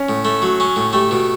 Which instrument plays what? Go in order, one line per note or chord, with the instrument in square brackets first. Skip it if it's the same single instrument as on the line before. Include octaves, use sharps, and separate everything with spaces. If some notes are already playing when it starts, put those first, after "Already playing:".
Already playing: [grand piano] C#4
[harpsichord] A2
A3
F#3
C#4
A2
[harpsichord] A3 [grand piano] G4
[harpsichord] B2